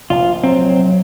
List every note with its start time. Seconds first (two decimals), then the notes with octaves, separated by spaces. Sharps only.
0.10 F1 A#1 F4
0.44 F#3 C4